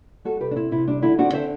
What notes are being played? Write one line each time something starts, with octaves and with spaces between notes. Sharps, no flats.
G3 F#4 A4
C3 G4 B4
D4
C4 E4
C3 E4
G3 D4
D3 E4
C4 D4 F#4
D3 C5 E5